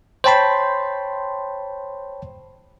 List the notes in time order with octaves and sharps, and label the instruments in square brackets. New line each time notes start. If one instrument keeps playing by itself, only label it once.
[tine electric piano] C5 C#5 G5 A5 B5 C6